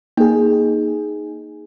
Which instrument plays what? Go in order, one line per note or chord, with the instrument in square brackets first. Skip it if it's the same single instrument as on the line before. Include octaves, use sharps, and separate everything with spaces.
[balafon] A#3 [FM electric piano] D#4 G#4